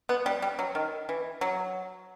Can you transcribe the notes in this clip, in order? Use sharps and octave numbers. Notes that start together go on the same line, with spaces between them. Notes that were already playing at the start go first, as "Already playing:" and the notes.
B3
G3
G3
F#3
D#3
E3
F#3